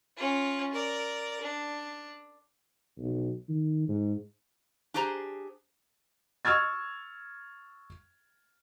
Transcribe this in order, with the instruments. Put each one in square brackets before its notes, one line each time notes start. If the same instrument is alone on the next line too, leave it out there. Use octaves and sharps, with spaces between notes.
[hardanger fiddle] C#4 F4
A#4 D5
D4
[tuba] B1
D#3
G#2
[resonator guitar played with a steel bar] D4 G4 G#4 C5 A#5
[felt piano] C#6 E6 F6 G#6 A6